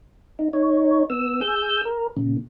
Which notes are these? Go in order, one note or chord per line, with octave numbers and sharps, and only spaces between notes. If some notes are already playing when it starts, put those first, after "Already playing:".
D#4
D#4 C#5
B3 E6
G#4 E6 G6
A#4
A#2 C#3